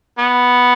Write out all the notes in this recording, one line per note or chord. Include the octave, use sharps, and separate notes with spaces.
B3